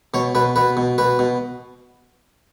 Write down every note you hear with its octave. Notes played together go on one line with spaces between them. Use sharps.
B2 C#5
B2 B4
B2 B4
B2
B2 B4
B2